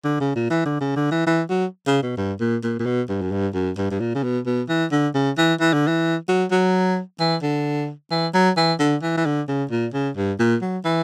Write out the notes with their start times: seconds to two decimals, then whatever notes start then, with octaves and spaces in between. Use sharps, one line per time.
0.05 D3
0.20 C#3
0.36 A#2
0.50 E3
0.65 D3
0.81 C#3
0.96 D3
1.11 E3
1.27 E3
1.49 F#3
1.87 C#3
2.03 B2
2.17 G2
2.40 A#2
2.63 A#2
2.79 A#2
2.86 B2
3.09 G2
3.22 F#2
3.32 G2
3.54 F#2
3.78 G2
3.91 G2
4.00 A#2
4.15 C#3
4.23 B2
4.46 B2
4.69 E3
4.92 D3
5.14 C#3
5.38 E3
5.60 E3
5.73 D3
5.87 E3
6.29 F#3
6.51 F#3
7.20 E3
7.43 D3
8.11 E3
8.34 F#3
8.57 E3
8.80 D3
9.02 E3
9.17 E3
9.26 D3
9.48 C#3
9.71 A#2
9.94 C#3
10.17 G2
10.40 A#2
10.62 F#3
10.85 E3